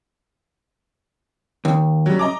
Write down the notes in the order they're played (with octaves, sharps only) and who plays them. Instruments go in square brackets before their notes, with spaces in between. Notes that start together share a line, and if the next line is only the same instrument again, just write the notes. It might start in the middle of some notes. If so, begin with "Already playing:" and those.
[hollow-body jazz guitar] D#2
[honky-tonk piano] F#3 G3
D#5 A#5 D6